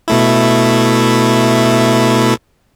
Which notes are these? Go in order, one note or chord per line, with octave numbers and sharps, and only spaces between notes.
B2 A3 E4